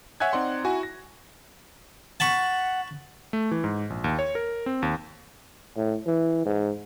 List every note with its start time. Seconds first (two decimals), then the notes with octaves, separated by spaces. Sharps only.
0.20 C#5 E5 F#5 G#5 F#6 G#6
0.33 C4 D#4 D5 F#5 C6
0.64 E4 F#4 G#5
0.83 A#6
2.20 F#5 A5 B5 C#6
3.33 A3
3.51 E3
3.64 G#2
3.90 A#1
4.04 D#2
4.19 C#5
4.35 A#4
4.66 C4
4.82 D#2
5.77 A2
6.06 E3
6.46 G#2